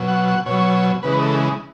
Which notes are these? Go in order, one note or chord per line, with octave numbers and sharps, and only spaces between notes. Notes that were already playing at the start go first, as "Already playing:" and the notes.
Already playing: B2 F#3
F#5
F#5
B2 F#3 C#5
C#3 E3 G#3 B4
A4